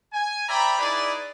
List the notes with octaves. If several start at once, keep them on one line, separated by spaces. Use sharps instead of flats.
G#5
C5 D5 E5 G5 A#5 B5
D#4 E4 G#4 B4 D5